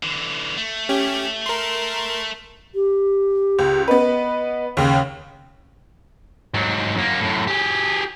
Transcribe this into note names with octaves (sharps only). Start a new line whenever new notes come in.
D3 E3
A3
C#4 G4
A#4 C6
G4
C#2
B3 B4 D#5
D#2 C#3
G#2 F#3
F#2 A#3
F#2 A2
G4 G#4